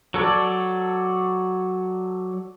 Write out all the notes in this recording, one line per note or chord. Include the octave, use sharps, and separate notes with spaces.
F#3 A4 C#5 D5